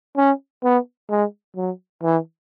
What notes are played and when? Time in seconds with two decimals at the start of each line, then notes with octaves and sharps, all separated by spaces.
0.17 C#4
0.64 B3
1.10 G#3
1.56 F#3
2.03 E3